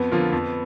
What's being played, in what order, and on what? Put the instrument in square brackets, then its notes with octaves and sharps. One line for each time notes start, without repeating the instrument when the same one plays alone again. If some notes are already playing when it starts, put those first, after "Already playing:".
Already playing: [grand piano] F2 [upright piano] B3
[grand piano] D3 F3 A#3 F4
F2